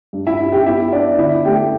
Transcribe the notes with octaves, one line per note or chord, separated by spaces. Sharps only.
G2
E4 E5
G3
G4 G5
B3 E4 E5
B3 D4 D5
D3 E4 E5
A3 G4 G5